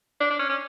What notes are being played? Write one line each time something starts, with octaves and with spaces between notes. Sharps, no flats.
D4
D4
C#4
C#4